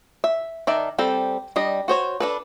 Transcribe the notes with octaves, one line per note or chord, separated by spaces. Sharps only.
E5
D#3 D5 E5 A5
G3 C4 A4
G3 D4 D#5
F#4 C5 C#5
D4 A4 B4